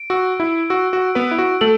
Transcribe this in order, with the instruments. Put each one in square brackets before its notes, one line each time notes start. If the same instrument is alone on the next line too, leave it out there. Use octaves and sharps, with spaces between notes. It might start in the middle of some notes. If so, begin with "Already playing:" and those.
Already playing: [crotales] D7
[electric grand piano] F#4 [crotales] E6
[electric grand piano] E4 [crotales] E6
[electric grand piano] F#4 [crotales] E6
[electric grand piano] F#4
[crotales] D7
[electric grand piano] B3 B4
[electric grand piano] E4 [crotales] D7
[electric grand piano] F#4
[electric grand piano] A3 A4 [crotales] F#7